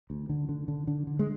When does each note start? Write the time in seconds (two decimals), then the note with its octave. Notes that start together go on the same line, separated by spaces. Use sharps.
0.10 D2
0.29 D3
0.49 D3
0.68 D3
0.87 D3
1.07 D3
1.19 G#3